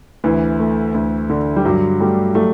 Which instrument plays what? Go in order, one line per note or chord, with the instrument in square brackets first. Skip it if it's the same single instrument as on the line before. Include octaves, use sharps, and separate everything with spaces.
[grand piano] D2 [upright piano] E3
[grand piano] A3
D2
D3
[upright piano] G3
[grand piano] G2 [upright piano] F#3
[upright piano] G3 [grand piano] A3
[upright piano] F#3 [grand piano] A3